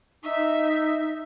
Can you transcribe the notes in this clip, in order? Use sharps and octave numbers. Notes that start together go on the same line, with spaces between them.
D#4 E5